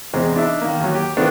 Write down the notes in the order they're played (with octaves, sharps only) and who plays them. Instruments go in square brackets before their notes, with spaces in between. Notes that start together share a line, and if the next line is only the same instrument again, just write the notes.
[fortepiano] E2 C3 G#3 C4
D4 D#4 E5
D#3 A#3
D#2 F#3
G4
D#3 A3 B3 C4 D4 F4